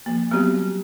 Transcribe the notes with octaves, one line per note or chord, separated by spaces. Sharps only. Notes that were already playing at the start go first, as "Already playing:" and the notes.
F3 A#3
F#3 G3 B3 C4 F#4 G4